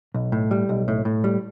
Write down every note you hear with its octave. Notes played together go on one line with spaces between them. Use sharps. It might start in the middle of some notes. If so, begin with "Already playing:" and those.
B1
A2
G3
B1
A2
A2
G3